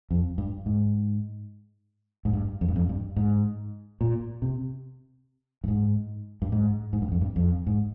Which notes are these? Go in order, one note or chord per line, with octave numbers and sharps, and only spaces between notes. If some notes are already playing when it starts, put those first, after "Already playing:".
F2
G2
G#2
G#2
G2
F2
G2
F2
G2
G#2
A#2
C3
G2
G#2
G2
G#2
G#2
G2
F2
G2
F2
G#2